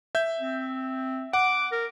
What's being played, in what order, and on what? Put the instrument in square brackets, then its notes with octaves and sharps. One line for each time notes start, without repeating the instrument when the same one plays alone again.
[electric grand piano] E5 G6
[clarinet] C4
[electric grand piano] F#5 [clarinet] D6
[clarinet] A#4